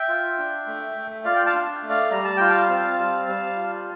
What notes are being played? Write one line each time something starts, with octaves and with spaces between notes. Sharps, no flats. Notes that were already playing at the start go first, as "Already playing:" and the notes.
Already playing: E5 G5
F4
D4
A3
A3
F4 D5 F5
G5
F5 A5
D4
A3
D5 F5
G3 A#5
A5
F4 G5
F5 A5
C4
G3
G3
F4